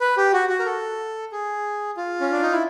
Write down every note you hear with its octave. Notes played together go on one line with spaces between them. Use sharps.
B4
G4
F#4
F#4
A#4
A4
G#4
F4
C#4
D4
D#4
E4